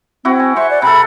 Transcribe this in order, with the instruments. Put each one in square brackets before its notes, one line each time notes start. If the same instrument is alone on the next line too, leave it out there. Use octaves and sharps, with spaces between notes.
[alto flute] C4 [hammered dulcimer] E4 F#4
[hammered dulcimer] G#5
[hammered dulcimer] C5 C#6 [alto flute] E5
[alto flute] D5
[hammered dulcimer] C3 A4 [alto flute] B5